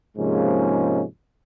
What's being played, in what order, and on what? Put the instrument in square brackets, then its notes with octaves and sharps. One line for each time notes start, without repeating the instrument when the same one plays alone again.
[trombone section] G#2 C3 F3 G#3 A#3 C#4